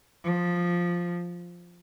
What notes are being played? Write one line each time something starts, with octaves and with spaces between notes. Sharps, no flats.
F3